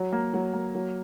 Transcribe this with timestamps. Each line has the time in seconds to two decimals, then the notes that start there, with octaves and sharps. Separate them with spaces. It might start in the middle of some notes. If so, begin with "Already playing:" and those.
Already playing: F#3
0.12 A#3
0.34 F#3
0.53 A#3
0.75 F#3